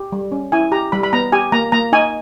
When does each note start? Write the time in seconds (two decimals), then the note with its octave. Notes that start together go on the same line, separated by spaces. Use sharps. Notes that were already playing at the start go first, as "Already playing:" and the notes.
Already playing: G4
0.12 G3
0.32 C#4
0.52 E4 G#5
0.72 G4 A#5
0.92 G3 B5
1.03 B5
1.13 B3 A#5
1.32 G4 G#5
1.52 A#3 A#5
1.72 A#3 A#5
1.92 D#4 G#5